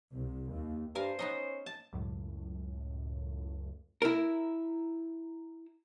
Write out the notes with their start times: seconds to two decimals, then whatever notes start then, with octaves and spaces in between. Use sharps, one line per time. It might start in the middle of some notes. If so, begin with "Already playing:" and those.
0.13 C2
0.50 D#2
0.95 G2 A#4 C5 F5 G#5
1.19 B3 C#4 D#4 D#5
1.66 A5
1.93 C#2 F#2 A2
4.02 E4 A#4